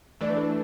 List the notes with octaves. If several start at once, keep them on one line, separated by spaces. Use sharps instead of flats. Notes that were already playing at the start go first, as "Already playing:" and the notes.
E3 A3 D4 D5
B4
A4